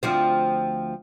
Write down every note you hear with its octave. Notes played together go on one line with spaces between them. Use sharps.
D2 F3 C4